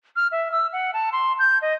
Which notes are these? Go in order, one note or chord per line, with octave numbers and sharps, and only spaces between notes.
F6
E5
E6
F#5
A5
C6
G6
D#5